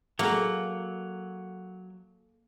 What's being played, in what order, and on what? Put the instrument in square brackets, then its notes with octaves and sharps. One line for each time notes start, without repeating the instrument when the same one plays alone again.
[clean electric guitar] F#3 [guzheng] A#3 [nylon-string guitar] G#4 A4 F#5